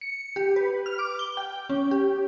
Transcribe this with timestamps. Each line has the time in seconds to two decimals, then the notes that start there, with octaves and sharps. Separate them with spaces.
0.01 C#7
0.36 G4
0.56 B4
0.86 F6
0.99 D6
1.19 G7
1.37 G5
1.70 C#4
1.91 G4